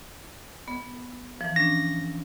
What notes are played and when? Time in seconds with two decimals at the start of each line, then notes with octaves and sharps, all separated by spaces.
0.68 B3
1.41 E3 F3
1.56 C#4 D4 A#6